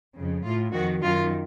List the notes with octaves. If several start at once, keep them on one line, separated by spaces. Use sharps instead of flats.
F2 C#3
A2 F4
F2 D#3 F#4
F#2 D#3 F4